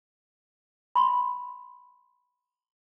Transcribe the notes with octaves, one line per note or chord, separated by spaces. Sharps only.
B5 C6